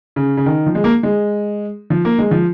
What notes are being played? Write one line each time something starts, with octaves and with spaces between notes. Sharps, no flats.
C#3
C#3
D#3
F3
G#3
A#3
G#3
F3
A#3
G#3
F3